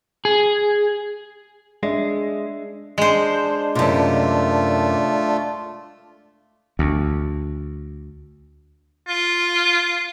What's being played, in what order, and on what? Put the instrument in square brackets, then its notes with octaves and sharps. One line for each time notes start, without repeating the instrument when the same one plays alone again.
[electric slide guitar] G#4
[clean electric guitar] G#3 [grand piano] D4 E5
[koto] G#3 C5 [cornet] D4
[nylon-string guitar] F#2 C3 [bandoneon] A3 F4
[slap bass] D2
[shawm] F4